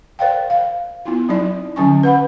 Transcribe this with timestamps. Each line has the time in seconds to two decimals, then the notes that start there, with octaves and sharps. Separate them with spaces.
0.19 A#4 C5 D5 F5 G5
0.50 F5
1.05 B3 E4 F4
1.29 F#3 C4 D#4 E4 D5
1.76 D3 F#3 C#4 G#5 C#6
2.03 B4 F#5 B5